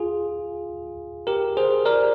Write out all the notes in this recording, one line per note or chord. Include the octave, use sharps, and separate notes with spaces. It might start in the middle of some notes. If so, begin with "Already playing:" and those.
Already playing: F4 G#4
G4 A#4
G#4 C5
A#4 D5